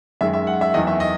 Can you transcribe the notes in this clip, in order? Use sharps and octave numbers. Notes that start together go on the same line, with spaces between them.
F#2 D#3 G#3 E5
E5
F#5
E5
E2 D#3 F#3 D#5
E5
D#5